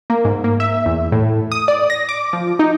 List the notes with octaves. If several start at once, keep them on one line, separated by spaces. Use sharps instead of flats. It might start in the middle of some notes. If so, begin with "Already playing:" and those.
A#3
G#2
A#3
E5
E2
A2
D#6
D5
A#6
D6
F3
D#4